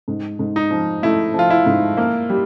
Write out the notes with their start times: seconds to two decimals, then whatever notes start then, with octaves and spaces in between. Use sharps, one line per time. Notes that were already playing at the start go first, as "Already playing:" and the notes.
0.08 G#2
0.39 G#2
0.56 D#4
0.71 F3
1.03 A3 E4
1.34 F3 F4
1.50 E4
1.66 G#2
1.97 A#3
2.30 G3